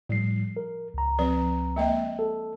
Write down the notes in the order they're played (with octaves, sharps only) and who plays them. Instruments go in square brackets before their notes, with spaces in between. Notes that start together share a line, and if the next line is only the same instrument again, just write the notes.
[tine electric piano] A2 G3 C7 [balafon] F3
[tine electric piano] A#4
C#2 A#5
[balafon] F3 C4 B4
G#3 A#3 D#5
[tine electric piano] A4